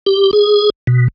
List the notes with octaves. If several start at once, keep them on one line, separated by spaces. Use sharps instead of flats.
G4
G#4
B2